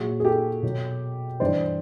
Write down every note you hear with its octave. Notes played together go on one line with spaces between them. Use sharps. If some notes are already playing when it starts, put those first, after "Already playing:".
Already playing: A#2 F#3 F#4 G#4
G#4
G4 A4
B2 F#3
G2 E3 G3 C5 D5